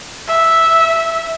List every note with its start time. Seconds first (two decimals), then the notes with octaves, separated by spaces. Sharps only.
0.28 E5